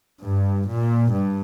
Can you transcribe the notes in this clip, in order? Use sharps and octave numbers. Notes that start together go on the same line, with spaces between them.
G2
A#2
G2